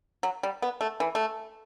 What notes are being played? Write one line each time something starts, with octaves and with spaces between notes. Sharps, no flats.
F#3
G3
B3
A3
E3
A3